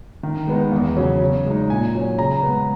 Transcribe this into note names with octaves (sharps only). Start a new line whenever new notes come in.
D#3
G#3 B3 D#4
E2
C#3 F#3 C#4
C#3
G#3 D#4
A#2 G#5
F#3 C#4
C#3 A#5
G#3 B3